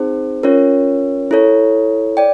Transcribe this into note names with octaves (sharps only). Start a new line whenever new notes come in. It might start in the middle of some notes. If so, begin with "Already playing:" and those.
Already playing: C4 D#4 G#4 C5
C#4 F4 A#4 C#5
E4 A4 C#5
D5 G5